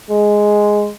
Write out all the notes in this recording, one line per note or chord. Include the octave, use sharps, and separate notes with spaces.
G#3